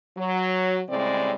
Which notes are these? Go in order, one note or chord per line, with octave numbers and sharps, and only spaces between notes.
F#3
A2 C#3 G3 G#3 C4 D5